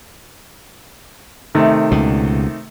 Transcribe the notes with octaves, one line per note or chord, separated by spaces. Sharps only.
C3 D#3 A3
C#2 B2